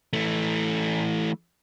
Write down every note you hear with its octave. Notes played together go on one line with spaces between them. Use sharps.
E3 A3